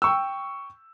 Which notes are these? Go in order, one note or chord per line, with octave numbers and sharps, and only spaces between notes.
G5 C#6 E6